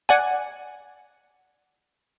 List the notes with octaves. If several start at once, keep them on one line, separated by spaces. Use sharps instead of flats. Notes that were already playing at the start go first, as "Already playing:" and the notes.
D5 F#5 G#5